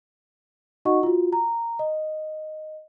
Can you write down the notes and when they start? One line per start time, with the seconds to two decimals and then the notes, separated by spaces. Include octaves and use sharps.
0.85 D#4 F#4 D#5 F#5 C#6
1.03 F4 F#4
1.33 A#5
1.79 D#5